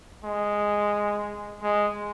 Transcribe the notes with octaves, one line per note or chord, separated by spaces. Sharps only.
G#3
G#3